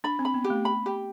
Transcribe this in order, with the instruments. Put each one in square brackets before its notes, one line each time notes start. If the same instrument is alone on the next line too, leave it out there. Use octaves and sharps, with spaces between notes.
[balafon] D4 [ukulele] B5
[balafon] C4
[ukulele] B5
[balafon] B3
[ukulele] G4
[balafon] A3
[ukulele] B5
G4